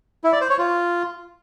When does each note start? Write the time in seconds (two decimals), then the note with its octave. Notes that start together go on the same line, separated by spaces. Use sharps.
0.24 E4
0.32 D5
0.41 C5
0.50 C#5
0.58 F4